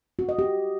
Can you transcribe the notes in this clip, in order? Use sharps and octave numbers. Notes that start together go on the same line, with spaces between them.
F#4
D#5
G4